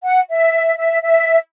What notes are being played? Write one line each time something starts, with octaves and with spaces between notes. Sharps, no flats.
F#5
E5
E5
E5